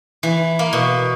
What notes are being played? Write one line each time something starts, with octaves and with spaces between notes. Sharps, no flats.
E3
A#3
B2